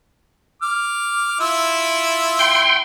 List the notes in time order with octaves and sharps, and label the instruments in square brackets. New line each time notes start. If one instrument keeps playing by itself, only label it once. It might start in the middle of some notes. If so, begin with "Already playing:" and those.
[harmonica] D6 F6
E4 F4 E6
[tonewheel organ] G5 C6